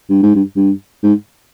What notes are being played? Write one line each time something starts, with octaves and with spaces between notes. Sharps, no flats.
G2
G#2
G2
G2
G#2